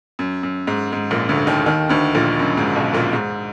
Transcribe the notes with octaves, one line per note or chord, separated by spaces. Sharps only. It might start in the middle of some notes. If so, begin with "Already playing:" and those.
F#2
F#2
G#2
G#2
A#1 A#2
D2 D3
D#2 D#3
D#2 D#3
D2 D3
A#1 A#2
F#2
G#2
B1 B2
A#1 A#2
G#2